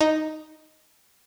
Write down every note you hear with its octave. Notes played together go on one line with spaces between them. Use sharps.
D#4